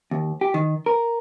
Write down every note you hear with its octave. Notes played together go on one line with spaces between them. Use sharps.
D#2
G4
D#3
A#4